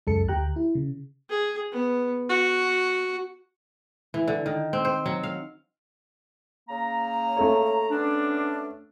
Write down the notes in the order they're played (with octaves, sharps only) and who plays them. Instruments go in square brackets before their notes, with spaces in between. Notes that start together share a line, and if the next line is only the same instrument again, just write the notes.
[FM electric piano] C#2 F#2 G#3 A4 A5 C#7
D2 G4 G5 A#5 F#6
E4
C#3
[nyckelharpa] G#4
B3
F#4
[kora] E3
D3
D#3
C4
C5
F#3
F5
[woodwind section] C#3 A#3 A#5
[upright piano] A3 A4 C#5
[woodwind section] B3 C#4 D4